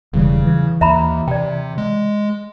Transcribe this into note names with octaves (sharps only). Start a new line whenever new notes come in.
E1 C#3 E3 G3
E3
D#2 E5 A#5 B5
C3 D5 G5
G#3